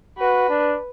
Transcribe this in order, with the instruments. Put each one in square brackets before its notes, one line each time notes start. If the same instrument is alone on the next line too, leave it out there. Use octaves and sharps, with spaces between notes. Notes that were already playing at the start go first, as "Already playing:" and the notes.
[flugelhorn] F#4 [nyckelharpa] B4
[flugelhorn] D4